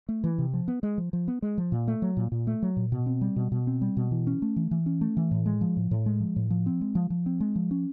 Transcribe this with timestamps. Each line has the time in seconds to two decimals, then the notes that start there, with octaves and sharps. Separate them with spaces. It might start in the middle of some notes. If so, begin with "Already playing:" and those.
0.09 A3
0.24 E3
0.38 C3
0.53 F3
0.68 B3
0.83 G#3
0.98 F3
1.13 F3
1.28 B3
1.42 G#3
1.58 F3
1.72 A#2
1.88 A3
2.02 F#3
2.17 A#2
2.32 A#2
2.47 A3
2.62 F#3
2.77 A#2
2.92 B2
3.06 C4
3.21 G3
3.36 B2
3.52 B2
3.67 C4
3.82 G3
3.97 B2
4.11 E3
4.27 C#4
4.42 A3
4.56 E3
4.71 E3
4.86 C#4
5.01 A3
5.17 E3
5.31 A2
5.46 G#3
5.61 F3
5.77 A2
5.91 A2
6.06 G#3
6.20 F3
6.36 A2
6.50 F3
6.66 C4
6.81 G#3
6.95 F3
7.10 F3
7.26 C4
7.40 G#3
7.56 F3
7.71 C#4